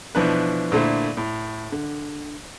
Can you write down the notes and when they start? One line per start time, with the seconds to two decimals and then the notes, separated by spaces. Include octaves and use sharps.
0.15 B2 E3 F3 D4 B4
0.72 A#2 D3 A3 E4 C5
1.17 A2
1.72 D3